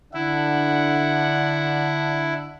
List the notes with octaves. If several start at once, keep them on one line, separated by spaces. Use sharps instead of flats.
D3 D4 E4 F#5